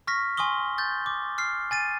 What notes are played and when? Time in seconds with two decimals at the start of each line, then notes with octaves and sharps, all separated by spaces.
0.07 C#6 F6 A#6 B6
0.37 G#5 C6 C#6 D#6 G7
0.78 G6 A6
1.06 D6
1.38 F6 C7
1.71 G#5 A6 D#7